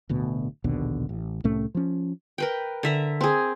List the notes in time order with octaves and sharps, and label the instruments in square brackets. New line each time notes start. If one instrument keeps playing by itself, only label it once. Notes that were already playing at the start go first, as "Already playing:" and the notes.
[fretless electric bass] D1 D2 B2
A#1 D#2 B2 D3
A1
C2 A2 A3 C#4
F3 C#4
[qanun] A#4 B4 G5
D3 E5 A#5
C4 G#4